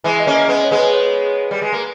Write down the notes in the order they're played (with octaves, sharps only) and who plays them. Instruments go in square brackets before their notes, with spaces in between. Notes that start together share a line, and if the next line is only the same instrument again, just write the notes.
[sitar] E3 G#3 [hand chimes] E5
[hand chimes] D#5
[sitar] A#3 C#4
[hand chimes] D#5
[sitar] G#3 B3 [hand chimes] D#5
[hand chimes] C#5
[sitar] G#3 B3
[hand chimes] B4
C#5
[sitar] G3
G#3
A#3